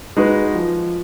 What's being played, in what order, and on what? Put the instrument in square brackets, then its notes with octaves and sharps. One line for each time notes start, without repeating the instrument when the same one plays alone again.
[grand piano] G#3 D#4 F#4 B4
F3